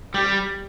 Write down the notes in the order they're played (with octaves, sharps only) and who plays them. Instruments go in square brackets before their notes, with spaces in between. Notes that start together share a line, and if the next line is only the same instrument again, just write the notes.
[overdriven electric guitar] G3 [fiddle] G4